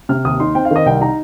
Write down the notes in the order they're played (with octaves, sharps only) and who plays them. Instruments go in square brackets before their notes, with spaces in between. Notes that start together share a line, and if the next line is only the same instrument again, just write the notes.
[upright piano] C3 F6
D#2 D#6
D#4 C6
C4 G5
F5
D#3 D#5
C2 G5
D#4 A#5